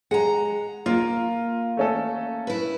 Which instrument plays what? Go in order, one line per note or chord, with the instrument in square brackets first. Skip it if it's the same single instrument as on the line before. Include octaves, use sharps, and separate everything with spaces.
[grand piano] G#3 [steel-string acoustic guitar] F#5 A#5
[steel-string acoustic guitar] A#3 [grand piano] F4
[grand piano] A3 C#4 A4
[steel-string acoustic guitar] E4 B4